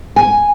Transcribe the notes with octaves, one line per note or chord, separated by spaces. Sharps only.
G#5